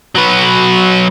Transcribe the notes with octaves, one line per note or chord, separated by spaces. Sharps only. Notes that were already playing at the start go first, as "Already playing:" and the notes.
F#3 B4